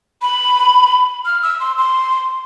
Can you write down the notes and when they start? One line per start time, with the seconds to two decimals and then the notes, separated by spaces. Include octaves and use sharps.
0.22 B5
1.26 F6
1.42 E6
1.60 C6
1.78 C6